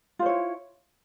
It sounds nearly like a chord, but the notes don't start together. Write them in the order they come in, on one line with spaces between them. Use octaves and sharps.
F4 C5 C#5 E4